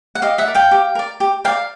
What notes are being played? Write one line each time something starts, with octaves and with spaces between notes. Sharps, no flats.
F#5
G4 D#5 F5
E5 F#5
A#4 D5
F5 G5
G4
A#4 D5
G4
A#4 D5 F5 G5